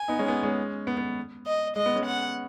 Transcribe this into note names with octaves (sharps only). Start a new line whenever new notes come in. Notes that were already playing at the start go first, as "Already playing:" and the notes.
Already playing: G#5
B3 D#4
G#3 C#4
B3
G#3 C#4
B3
B3
D#5
G#3 D#5
B3
G#3 C#4
F#5